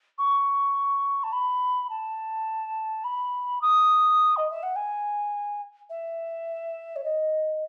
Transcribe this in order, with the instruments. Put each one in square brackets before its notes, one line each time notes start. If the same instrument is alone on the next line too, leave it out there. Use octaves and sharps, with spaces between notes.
[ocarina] C#6
A5
B5
A5
B5
D#6
D#5
E5
F#5
G#5
E5
C#5
D#5